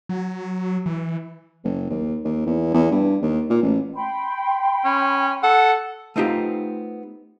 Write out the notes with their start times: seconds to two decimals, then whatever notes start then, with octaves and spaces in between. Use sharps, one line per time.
0.09 F#3
0.86 E3
1.64 F#1
1.90 D#2
2.25 D#2
2.46 E2
2.74 E2
2.91 G2
3.22 D#2
3.50 A#2
3.62 A1
3.95 G5 B5 C6
4.85 C#4
5.43 A4 F#5
6.16 A3 B3 C4 D#4 F4 G4